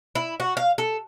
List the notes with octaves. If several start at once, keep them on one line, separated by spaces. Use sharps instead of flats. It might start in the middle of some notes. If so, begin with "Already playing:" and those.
E4
F#4
F5
A4